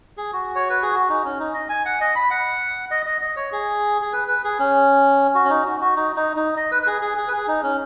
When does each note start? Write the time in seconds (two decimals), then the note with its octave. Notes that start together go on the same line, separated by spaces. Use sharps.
0.17 G#4
0.33 F#4
0.55 C#5
0.70 B4
0.82 G#4
0.95 F#4
1.09 D#4
1.25 C#4
1.40 D#4
1.54 D#5
1.69 G#5
1.85 F#5
2.01 D#5
2.15 B5
2.30 F#5
2.91 D#5
3.06 D#5
3.22 D#5
3.36 C#5
3.52 G#4
4.02 G#4
4.13 B4
4.28 B4
4.44 G#4
4.59 C#4
5.35 F#4
5.44 C#4
5.50 D#4
5.65 F#4
5.81 F#4
5.96 D#4
6.16 D#4
6.36 D#4
6.57 D#5
6.72 B4
6.83 B4
6.86 G#4
7.01 G#4
7.17 G#4
7.28 B4
7.33 G#4
7.48 D#4
7.63 C#4